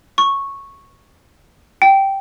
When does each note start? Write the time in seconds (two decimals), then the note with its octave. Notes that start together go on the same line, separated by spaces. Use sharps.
0.18 C#6
1.82 G5